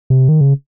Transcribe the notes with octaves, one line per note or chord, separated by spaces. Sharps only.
C3
D#3
C#3